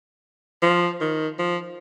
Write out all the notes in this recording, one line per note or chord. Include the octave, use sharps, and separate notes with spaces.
F3
D#3
F3